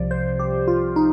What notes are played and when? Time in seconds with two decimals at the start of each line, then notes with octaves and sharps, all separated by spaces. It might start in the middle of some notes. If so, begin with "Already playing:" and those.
Already playing: C2 C3 F3 D5
0.11 C5
0.39 G4
0.68 F4
0.96 D#4